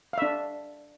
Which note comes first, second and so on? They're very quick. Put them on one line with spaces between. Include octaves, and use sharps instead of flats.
F5 E5 D4